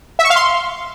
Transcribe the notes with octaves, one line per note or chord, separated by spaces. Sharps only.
E5
C#6
F5
C6